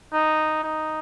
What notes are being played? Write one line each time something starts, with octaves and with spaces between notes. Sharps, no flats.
D#4
D#4